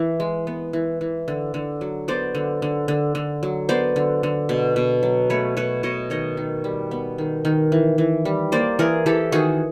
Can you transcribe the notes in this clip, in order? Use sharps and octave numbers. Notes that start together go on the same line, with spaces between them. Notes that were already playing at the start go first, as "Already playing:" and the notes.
Already playing: E3
G#3
B3
E3
E3
D3
D3
F#3
B3 C5 D5
D3
D3
D3
D3
F#3
B3 C5 D5
D3
D3
B2
B2
F#3
A3 B4 C#5
B2 B4 C#5
B2 C#5 D#5
D#3 C#5 D#5
D#3
G3
B3
D#3
D#3
E3
E3
G3
A#3 C5 D5
E3 G#4 A#4
E3 G4 A4
D#3 F#4 G#4